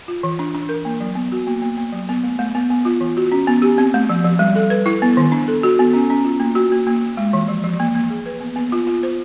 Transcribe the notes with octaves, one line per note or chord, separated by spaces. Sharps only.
F4
E3
D4
D4
A#4
A#3
F#3
B3
F#4
A#3
A#3
A#3
F#3
B3
A3
A3
B3
B3
F4
E3
F#4
C#4
B3
G4
C4
A3
F3
F3
G3
A4
B4
E4
B3
D#3
D4
A4
F#4
B3
C#4
C#4
F4
A#3
F#4
A#3
A#3
A#3
G#3
E3
F3
F3
A#3
A#3
G#4
B4
B3
B3
F4
F4
C5